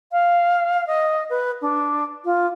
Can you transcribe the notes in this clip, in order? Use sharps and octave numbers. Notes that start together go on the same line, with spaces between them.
F5
D#5
B4
D4
F4